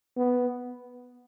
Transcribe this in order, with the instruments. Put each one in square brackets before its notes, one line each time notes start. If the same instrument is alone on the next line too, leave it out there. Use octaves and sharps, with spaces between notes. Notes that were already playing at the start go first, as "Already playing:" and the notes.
[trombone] B3